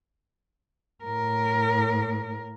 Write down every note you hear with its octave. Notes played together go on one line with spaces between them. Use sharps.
A2 A#4